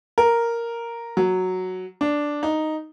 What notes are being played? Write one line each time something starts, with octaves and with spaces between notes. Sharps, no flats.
A#4
F#3
D4
D#4